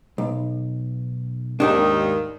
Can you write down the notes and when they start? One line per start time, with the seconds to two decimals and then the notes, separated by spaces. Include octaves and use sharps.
0.18 B1
1.60 D#2 G#2 D#3 D4